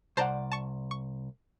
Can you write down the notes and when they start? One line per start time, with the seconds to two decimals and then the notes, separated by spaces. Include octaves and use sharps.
0.17 C2 C5 D5 F#5 A5 A#5
0.51 A5 C#6
0.91 C#6